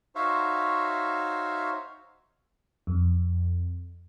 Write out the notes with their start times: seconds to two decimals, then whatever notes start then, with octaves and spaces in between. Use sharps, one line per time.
0.15 D#4 F#4 C5 C#5 E5 F5
2.87 F2